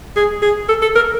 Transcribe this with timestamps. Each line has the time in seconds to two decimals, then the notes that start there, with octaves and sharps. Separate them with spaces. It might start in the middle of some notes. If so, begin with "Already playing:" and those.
0.16 G#4
0.42 G#4
0.69 A4
0.82 A4
0.96 A#4